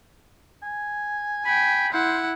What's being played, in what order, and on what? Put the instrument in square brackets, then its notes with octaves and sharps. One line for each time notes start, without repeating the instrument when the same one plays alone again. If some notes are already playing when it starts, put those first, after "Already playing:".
[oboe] G#5
[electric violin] G5 G#5 [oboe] B5
[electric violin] E4 F#5 [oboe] C5